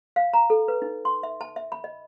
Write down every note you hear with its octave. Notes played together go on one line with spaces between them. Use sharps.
F5
A#5
A4
B4
D#4
C6
E5
A5
E5
B5
D#5